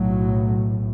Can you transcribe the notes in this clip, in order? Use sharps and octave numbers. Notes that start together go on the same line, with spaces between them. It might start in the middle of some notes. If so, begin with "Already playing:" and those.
Already playing: B1 A2 F#3